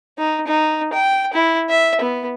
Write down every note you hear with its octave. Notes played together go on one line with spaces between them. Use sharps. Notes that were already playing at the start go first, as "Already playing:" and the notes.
D#4
D#4
G5
E4
E5
B3